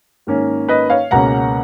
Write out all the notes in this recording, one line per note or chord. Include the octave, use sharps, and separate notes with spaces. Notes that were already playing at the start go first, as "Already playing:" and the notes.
G#2 D#3 A#3 C#4
B4 D#5
C#5 F5
C#2 B2 A#3 C#4 F#5 A#5